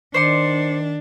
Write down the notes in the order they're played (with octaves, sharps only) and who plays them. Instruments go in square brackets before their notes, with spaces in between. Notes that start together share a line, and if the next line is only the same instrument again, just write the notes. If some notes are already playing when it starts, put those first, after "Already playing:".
[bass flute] D#3 [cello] D4 [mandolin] C5 D5 C6 [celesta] C7 C#7